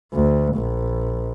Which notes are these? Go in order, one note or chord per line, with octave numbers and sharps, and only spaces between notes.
D2
A#1